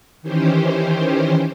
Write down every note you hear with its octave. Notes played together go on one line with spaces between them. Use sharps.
D#3 E3 C#4 G4 C5